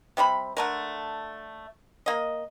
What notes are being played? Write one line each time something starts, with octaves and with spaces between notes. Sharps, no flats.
C3 G3 C4 B5
D3 A3 A#4
A#3 D#5